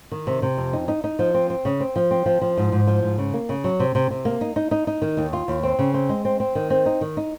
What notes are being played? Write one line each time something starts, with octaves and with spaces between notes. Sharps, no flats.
D#3
C3
C3
F2
D#4
D#4
D#4
F3
C4
C4
C#3
C4
F3
C4
F3
F3
G#2
G#2
F3
G#2
C#3
A#3
C#3
F#3
C3
C3
C3
A#3
D#4
D#4
D#4
D#4
D#3
D#2
F4
D#2
C4
C#3
C4
G#3
C4
C4
D#3
C4
D#4
D#3
D#4